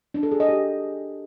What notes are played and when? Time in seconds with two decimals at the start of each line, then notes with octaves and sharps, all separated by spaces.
0.14 D4
0.23 A4
0.32 G#4
0.40 D#5
0.49 G4